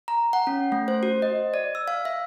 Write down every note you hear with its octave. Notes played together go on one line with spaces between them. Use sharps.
A#5
F#5
C#4
A3
C5
F#4
D#5
D5
E6
F5
E5